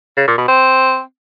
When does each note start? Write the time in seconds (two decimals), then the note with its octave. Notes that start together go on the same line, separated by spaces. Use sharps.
0.17 C#3
0.27 A#2
0.38 B2
0.48 C4